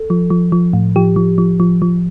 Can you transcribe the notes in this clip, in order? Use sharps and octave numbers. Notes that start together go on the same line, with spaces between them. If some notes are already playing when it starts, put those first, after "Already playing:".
Already playing: A4
F3
F3
F3
A2
F3 G4
F3
F3
F3
F3